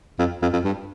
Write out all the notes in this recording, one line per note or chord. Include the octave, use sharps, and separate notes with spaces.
F2
F2
F2
G2